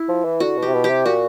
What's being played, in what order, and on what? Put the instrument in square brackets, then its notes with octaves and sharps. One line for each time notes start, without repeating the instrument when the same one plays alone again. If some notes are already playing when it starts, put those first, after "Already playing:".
Already playing: [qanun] E4
[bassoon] F3
E3
[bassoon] D3 [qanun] F#4
[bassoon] B2
[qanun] G4
[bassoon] C3
B2
[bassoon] C3 [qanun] G4
[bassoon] A#2 [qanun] F#4